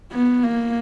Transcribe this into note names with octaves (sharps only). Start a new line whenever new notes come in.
B3
A#3